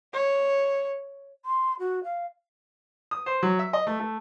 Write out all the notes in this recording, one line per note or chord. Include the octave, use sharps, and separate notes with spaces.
C#5
C6
F#4
F5
D#6
C5
F#3
E5
D#5
A3
A3